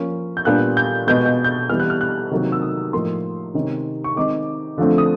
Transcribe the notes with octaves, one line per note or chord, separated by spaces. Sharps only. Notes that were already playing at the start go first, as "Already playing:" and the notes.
Already playing: F3 A#3 C#4
G6
A#2 G3 B3 D4 F#6
G6
B2 G#3 B3 G6
G6
G6
E3 G3 B3 F6
F#6
F6
F#6
C3 D#3 F#3 A#3
E6
D#6
A2 F3 A#3 D#4 C6
C3 D#3 G#3 C#4
C#6
D#3 G#3 C4 D#4 D6
D3 F3 A3 C4
D#6